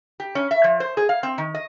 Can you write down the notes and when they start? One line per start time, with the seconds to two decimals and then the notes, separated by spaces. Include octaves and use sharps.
0.20 G4
0.35 C#4
0.51 E5
0.64 F3
0.80 C5
0.97 G#4
1.09 F5
1.23 C4
1.38 D#3
1.54 D#5